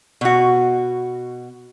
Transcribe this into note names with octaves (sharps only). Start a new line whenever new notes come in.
B2 F#4